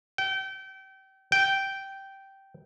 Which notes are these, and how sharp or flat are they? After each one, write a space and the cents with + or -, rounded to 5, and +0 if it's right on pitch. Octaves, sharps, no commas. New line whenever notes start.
G5 -30
G5 -10